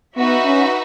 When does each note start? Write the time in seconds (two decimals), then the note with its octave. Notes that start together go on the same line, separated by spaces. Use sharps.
0.16 B3 D#4 F#4 B4 E5
0.45 C#4